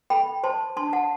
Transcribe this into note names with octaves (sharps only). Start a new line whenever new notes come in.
A4 G5 B5
C5 A5 C6
D4 A5 C6
F#5 A5